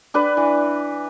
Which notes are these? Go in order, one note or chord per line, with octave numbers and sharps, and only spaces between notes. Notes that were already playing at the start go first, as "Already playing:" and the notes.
D4 B4
E3